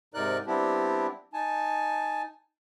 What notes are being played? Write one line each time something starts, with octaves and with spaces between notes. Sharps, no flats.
G#2 C3 D#4 A#4 D5 F#6
G3 B3 C4 D4 E4 G4
D#4 G#5 A5